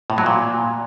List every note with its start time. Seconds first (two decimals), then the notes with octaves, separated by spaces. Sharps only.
0.10 A2
0.18 F#3
0.26 A#2